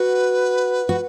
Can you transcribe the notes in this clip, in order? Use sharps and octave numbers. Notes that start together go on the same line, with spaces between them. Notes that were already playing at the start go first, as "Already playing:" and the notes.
Already playing: F#4 B4
F#4